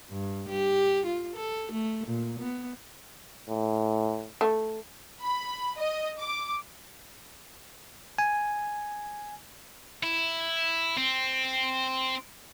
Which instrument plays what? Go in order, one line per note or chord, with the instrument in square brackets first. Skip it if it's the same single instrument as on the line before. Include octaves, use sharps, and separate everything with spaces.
[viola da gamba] G2
G4
F4
A4
A3
A#2
B3
[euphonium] A2
[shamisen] A3
[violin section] B5
D#5
D6
[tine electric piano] G#5
[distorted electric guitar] E4
C4